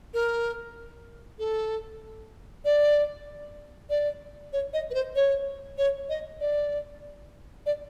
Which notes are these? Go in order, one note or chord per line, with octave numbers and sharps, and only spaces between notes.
A#4
A4
D5
D5
C#5
D#5
B4
C5
C#5
C#5
D#5
D5
D5